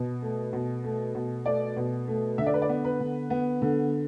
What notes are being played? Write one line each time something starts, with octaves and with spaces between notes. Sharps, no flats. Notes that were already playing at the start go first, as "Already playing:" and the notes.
Already playing: B2
A3
B2
A3
B2
A3 D5
B2
A3
D3 E5
D5
B4
D5
B3
B4
D3
B3
D3